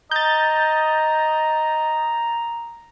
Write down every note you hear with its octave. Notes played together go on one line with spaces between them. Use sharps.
D#5 A#5 G6 A6